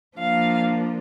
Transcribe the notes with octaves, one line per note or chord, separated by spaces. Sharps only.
F3 A#3 D4 F5